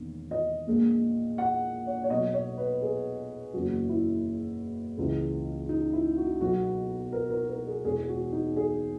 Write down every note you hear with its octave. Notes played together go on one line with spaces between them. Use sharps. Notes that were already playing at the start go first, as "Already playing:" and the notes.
Already playing: E1 D#2 D#3
D#5
A#1 A#2 G#3
F#5
C#5
C#5
B1 B2 F#3 D#5
C#5
B4
G#4
F#1 E2 C#3 F#3 F#4
E4
C#2 C#3 E3 G#3
D#4
E4
F#4
B1 B2 F#3 F#4
A#4
A#4
A#4
G#4
E1 E2 B2 G#3 G#4
F#4
D#4
G#4